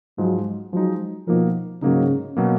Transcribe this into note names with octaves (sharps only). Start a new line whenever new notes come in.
G#2 F3 F#3 G#3
F3 F#3 G#3 D#4
B2 F3 A#3 D#4 A#4
G#2 C#3 F#3 A#3 D#4
B2 F#3 A#3